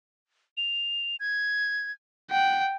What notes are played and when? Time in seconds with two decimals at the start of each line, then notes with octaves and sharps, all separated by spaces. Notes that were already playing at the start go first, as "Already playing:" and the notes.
0.57 F7
1.20 G#6
2.31 F#5 G5